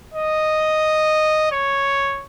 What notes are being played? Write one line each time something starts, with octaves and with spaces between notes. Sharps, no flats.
D#5
C#5